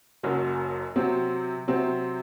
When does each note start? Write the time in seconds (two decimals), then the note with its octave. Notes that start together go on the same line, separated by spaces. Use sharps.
0.23 F#1 F#2 F#3
0.96 C3 F#3 C4
1.68 C3 F#3 C4